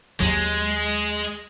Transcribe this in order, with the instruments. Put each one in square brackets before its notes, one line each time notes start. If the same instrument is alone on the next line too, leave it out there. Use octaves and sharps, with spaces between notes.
[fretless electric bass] D#2 F#3 [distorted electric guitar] G#3